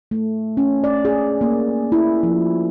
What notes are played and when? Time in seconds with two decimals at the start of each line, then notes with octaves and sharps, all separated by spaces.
0.11 A3
0.57 C#4
0.84 D5
1.05 G#4
1.41 A#3
1.92 E4
2.23 F3